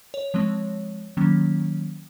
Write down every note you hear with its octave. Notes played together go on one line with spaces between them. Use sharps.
C#5
F3 G#3 C4
D#3 F#3 A#3 C#4